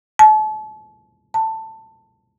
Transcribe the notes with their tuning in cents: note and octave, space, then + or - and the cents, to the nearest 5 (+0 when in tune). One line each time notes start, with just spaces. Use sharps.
A5 -35
A5 +15